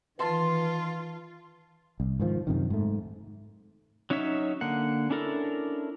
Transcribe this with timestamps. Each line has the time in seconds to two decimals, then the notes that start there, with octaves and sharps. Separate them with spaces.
0.19 D#3 E3 F4 B4 A5 C6
2.00 C2
2.20 G#2 D#3 F3
2.47 F#2 C3 D#3
2.70 G#2 A3
4.10 F#3 C#4 D#4 C#5 E5
4.61 D3 A#3 F#5
5.10 C#4 D4 E4 A4 A#4